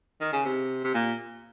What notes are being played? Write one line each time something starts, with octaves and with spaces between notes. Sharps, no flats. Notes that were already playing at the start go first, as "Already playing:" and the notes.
D#3
C#3
C3
C3
A#2